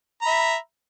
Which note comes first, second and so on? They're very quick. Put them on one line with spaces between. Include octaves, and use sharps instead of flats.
A#5 B5 E5